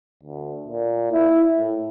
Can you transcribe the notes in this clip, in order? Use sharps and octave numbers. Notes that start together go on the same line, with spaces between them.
D2
A#2
E4
A2